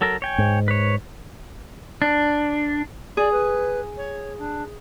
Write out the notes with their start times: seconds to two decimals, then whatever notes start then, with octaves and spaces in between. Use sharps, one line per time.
0.01 F#3 A4 A#4
0.22 C#5 G5 G#5
0.38 G#2
0.68 B4 C#5
2.02 D4
3.17 G#4 D5
3.32 B4
3.97 C#5
4.38 D4